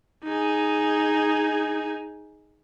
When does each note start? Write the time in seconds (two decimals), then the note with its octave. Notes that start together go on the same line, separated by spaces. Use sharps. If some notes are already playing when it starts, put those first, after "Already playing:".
0.24 D#4 G#4